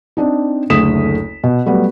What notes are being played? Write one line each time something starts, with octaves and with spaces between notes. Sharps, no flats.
C4 D4 D#4
F#1 D2 A3 D#6 B6 E7
B2
F#3 G3 A3 B3